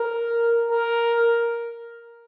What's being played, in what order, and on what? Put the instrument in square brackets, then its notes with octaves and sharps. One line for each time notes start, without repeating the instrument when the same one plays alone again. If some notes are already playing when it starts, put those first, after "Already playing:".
Already playing: [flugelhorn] A#4
A#4